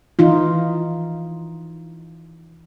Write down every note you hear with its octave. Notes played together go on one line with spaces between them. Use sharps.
E3 D#4 F4